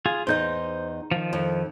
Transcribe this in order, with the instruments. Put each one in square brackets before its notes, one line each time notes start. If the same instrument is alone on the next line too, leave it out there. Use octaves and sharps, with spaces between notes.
[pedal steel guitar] F4 G#4
[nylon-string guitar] E2 D#4 D#5 [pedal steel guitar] C5 G6
[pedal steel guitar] D#3 F3
[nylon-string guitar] F2